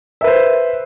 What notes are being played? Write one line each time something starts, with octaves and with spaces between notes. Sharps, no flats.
B4 C5 E5